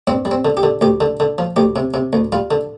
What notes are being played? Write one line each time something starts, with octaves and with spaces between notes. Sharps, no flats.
G2 C4
G3
C4
D3
G4
D3
D2 G4
D3
D3
F3
D2 G4
C3
C3
D2
G3 F4
D3